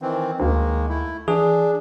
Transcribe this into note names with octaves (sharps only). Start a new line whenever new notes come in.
D#3 E3 C4
D2 D#3 G#3 A#3
A3 E4
E3 D4 G#4